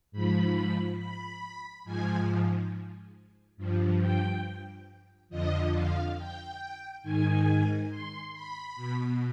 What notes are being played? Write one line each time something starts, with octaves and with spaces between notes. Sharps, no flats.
G#2 F3 B5
B5
G#2 F3 G#5
G2 F3
G5
F2 D3 F3 D#5
F5
G5
G#2 D#3 G#5
C6
B5
B2